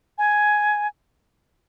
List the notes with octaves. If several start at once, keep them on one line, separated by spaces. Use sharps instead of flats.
G#5